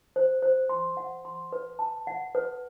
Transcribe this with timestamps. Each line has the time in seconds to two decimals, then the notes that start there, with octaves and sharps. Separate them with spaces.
0.16 C5
0.42 C5
0.69 C6
0.97 F#5
1.25 C6
1.52 B4
1.79 A5
2.07 F#5
2.35 B4